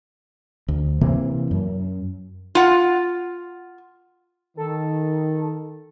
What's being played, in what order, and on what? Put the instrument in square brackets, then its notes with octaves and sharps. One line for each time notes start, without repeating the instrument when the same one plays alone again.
[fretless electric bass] D2
C3 E3 A#3 C4
F#2
[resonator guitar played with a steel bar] F4 F#5
[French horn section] D#3 [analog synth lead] A4